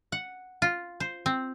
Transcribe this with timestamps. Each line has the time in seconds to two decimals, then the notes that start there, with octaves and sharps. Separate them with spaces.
0.12 F#5
0.62 F4
1.00 C5
1.26 C4